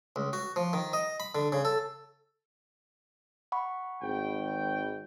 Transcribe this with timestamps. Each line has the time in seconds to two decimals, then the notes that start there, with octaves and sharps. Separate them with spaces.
0.16 C#2
0.33 F#4
0.56 F3
0.73 D#3
0.93 D#5
1.20 B5
1.35 D3
1.52 C#3
1.65 A4
3.52 F#5 B5 C#6
4.02 G#1 G5